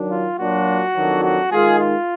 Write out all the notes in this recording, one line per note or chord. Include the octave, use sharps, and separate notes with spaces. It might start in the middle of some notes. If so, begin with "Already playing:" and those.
Already playing: D#3 F#3 D4
F4
A#2 F#3 D4 F4 F#4
F2 D#3 F#3 D4
F#4
D#3 G#3 D#4 F4 G#4
F4